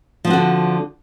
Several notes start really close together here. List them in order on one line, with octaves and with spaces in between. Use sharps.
F3 C4 F#4 D3